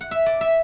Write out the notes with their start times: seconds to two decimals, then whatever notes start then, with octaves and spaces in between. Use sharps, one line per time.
0.01 F#5
0.11 E5
0.26 D5
0.41 E5